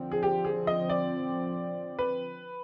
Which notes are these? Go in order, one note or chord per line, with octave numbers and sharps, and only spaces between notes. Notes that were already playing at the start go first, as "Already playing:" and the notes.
Already playing: D3 F3 C4
G#4
G4
G#4
D#5
D5
B4